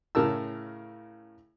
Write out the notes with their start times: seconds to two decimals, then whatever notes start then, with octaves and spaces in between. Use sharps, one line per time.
0.15 A2 C#3 A#4 A5 E6